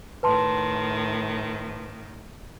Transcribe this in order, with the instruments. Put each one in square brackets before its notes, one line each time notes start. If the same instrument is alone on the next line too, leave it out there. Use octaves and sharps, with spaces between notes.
[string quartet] A2 D#3 [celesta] B4 A5 C6